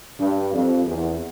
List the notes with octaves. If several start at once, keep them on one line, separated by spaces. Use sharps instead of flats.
G2
F2
E2